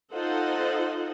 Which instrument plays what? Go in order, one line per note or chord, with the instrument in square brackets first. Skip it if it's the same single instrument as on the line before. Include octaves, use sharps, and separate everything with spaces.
[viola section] D#4 F4 A4 C5 D#5 F#5